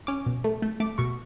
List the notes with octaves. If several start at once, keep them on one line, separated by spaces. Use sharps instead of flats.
C#4 D6
B2
A3
A3
A3 D6
B2 C#6